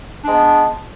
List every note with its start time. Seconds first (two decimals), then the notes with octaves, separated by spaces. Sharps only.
0.23 D4
0.28 G#3
0.32 B3